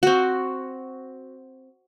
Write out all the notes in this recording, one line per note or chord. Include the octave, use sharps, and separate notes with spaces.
C4 F#4